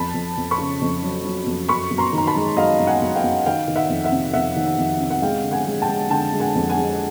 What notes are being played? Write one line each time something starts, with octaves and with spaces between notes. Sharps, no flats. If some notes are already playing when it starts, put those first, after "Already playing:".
Already playing: F2 A5 B5
F2
F2
B5 C#6
C#3
F2
F#3
F#3
F2
F#2 B5 C#6
F#2
A#5 C6
D#3 A#5
A5 B5
G#3
F#2 D#5 F5
F#2
F#5 G#5
F#2
F5 G5
F#2
D#3 F5 G5
D#3
E5 F#5
F2
E5 F#5
C3
F2 E5 F#5
D#3
F2
C3
F#5
G#3 F5 G5
D3
F#5 G#5
G#3
G5 A5
G#3
D3 G5 A5
G#3
F#5 G#5
F2
F#5 G#5
G#3